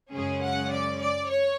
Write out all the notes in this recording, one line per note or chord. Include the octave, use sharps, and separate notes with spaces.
F#2 C#3 G#3 C#4 G#4
F#5
D5
D5
C#5